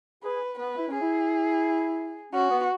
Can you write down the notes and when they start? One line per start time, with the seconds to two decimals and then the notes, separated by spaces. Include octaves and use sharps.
0.23 G#4 B4
0.59 B3 B4
0.76 E4
0.89 C#4
0.94 G#4
1.01 E4
2.33 C#4 F#4
2.51 B3